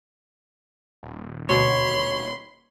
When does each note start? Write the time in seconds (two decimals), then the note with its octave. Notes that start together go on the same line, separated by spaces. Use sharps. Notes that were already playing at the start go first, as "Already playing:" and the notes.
1.03 D#1
1.49 D2 B2 C#5 B5 C6